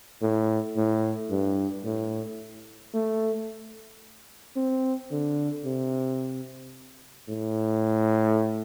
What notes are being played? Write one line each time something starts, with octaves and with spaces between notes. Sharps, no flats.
A2
A2
G2
A2
A3
C4
D3
C3
A2